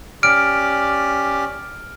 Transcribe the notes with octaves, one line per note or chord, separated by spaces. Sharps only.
C#4 G4 D5 F6 D7